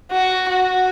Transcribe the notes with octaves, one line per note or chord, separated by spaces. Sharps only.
F#4
F#4